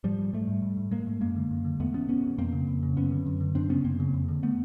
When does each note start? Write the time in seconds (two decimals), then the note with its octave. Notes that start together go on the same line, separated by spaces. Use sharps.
0.04 G#2 F3 G3
0.18 G#2
0.33 G#2 G3 A3
0.47 G#2
0.62 G#2
0.77 G#2
0.91 G#2 G#3 A#3
1.07 G#2
1.20 F#2 G#3 A#3
1.36 D3
1.51 F#2
1.65 D3
1.80 E2 A3 B3
1.94 B2 B3 C#4
2.09 E2 B3 C#4
2.23 B2
2.38 F2 A#3 C4
2.53 C#3
2.67 F2
2.83 C#3
2.96 F#2 B3 C#4
3.11 D3
3.26 F#2
3.41 D3
3.55 F#2 C4 D4
3.69 C#3 B3 C#4
3.84 F#2 A#3 C4
4.00 C#3
4.14 F2
4.28 D3
4.43 A3 B3